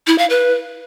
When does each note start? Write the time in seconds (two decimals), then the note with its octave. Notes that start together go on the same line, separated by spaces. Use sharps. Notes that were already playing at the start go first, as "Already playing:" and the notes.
0.07 E4
0.18 F5
0.30 B4